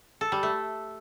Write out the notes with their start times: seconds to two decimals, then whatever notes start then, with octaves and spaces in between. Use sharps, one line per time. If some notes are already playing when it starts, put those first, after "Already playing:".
0.21 A4
0.32 G3
0.43 A3